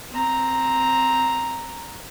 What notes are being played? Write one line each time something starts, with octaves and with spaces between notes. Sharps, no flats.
C4 A#5